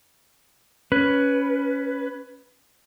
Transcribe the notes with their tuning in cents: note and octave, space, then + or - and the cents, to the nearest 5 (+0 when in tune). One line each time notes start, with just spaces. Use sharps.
C#4 +10 B4 +0